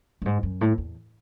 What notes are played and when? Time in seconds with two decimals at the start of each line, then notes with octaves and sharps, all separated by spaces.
0.22 F#2
0.26 G#2
0.43 F#2
0.61 A2
0.78 E2